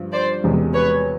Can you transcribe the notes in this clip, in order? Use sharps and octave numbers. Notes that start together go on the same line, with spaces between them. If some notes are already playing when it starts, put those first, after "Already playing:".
Already playing: G2 D3 F3
C5 D5
E1 E2 C3 E3 G#3
B4 C#5